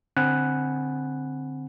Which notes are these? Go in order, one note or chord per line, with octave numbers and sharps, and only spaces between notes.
D3 C4 F#5 G#5 B5 F#6